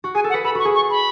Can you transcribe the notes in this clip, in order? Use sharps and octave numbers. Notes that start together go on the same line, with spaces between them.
F#4
G#4 G#5
A4
F#5
B4
A4 B5
F#4 C#6
G#4
C#6
B5